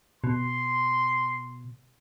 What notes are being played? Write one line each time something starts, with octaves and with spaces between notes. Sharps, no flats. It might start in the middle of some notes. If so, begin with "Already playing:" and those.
B2 C6